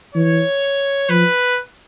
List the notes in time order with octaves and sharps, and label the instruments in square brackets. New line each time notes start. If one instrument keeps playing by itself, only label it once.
[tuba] E3 [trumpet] C#5
[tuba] F3 [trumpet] B4